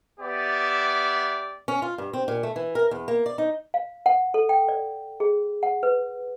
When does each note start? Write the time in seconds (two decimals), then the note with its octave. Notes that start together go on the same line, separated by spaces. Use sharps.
0.19 B3 G4 D5 E5
1.68 C#4
1.82 F4
1.98 G2
2.13 C4
2.28 A#2
2.43 A3
2.56 E3
2.75 A#4
2.91 E2
3.08 A#3
3.26 D5
3.38 D#4
3.74 F5
4.06 F#5
4.34 A4
4.49 G5
4.68 D5
5.20 G#4
5.63 F#5
5.83 B4